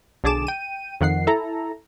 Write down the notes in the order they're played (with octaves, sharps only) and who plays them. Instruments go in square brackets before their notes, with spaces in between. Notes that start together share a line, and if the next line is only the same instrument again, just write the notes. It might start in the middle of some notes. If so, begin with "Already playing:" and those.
[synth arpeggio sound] B1 D3 G#4 A5 D6 E7
G5 D#7
F2 D#3 F#5 C7
E4 A4 A#5